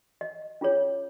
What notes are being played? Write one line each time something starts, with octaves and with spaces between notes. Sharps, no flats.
D#5
C#4 F4 G#4 C#5